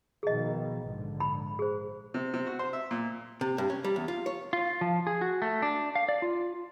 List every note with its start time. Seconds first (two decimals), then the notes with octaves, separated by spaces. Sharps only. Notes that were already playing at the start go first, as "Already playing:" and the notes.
0.23 B2 D#3 F3 G#4 D#5
0.85 A#1 G#2 D3
1.20 B5
1.59 G#4 C5
2.14 C3
2.34 C3
2.47 F#4
2.59 C5
2.73 E5
2.91 A#2
3.41 C3
3.58 G2
3.70 C#4
3.84 G3
3.96 E2
4.08 F4
4.26 C#5
4.53 F4
4.81 F3
5.07 G#4
5.21 F#4
5.42 A3
5.62 D4
5.96 F5
6.09 D5
6.22 F4